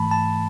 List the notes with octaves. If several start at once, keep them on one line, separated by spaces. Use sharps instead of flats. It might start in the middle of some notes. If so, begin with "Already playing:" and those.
Already playing: G#2 E3 A3 A5 B5
A5